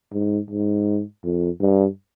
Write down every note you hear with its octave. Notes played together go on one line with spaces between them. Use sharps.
G#2
G#2
F2
G2